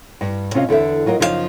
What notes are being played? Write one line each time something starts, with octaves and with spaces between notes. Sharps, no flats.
G2
C3 C#4 F4 D#5 F5
E2 D3 A4 E5
F#3 F4 A#4 D#5
F#2 C#3 F3 D#4 G4 F5